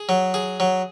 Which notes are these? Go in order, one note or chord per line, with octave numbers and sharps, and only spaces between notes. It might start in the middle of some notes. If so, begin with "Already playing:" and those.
Already playing: G#4
F#3
G#4
F#3